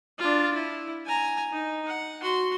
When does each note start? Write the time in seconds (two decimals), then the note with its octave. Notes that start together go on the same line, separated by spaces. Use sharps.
0.19 D4 F4
0.54 E4
1.05 G#5 A#5
1.52 D#4
1.87 F#5
2.22 F#4 C6